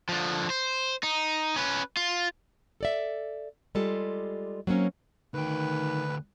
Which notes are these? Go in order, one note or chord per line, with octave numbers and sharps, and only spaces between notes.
D3 F3
C5
D#4
C#4 B4
F4
A4 D5 E5
G3 G#3 F4 G4 A4
F#3 A#3 C4 C#4
D2 D#3 B4 G5